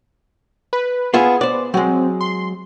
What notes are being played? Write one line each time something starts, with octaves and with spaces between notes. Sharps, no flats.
B4
B3 F4 G#4 E5
B3 C5 D5
F#3 G#3 C4
C6